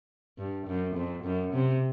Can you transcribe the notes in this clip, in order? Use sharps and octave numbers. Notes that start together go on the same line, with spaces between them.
G2
F#2
F2
F#2
C3